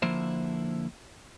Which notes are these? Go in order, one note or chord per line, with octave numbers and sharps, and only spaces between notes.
D3 F3 A#3 E4 C5